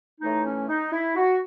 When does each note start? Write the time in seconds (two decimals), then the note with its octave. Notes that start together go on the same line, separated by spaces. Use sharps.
0.21 A2 E3 A3 D#4
0.45 C#4
0.69 D#4
0.92 E4
1.16 F#4